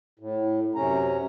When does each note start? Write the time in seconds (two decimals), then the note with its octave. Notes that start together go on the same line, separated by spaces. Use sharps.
0.19 A2
0.75 F#2 C3 C#4 A#5